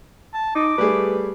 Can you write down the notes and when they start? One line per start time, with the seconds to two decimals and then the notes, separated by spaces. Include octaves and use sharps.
0.33 A5
0.55 D#4 D6
0.78 G3 A3 G#4 B4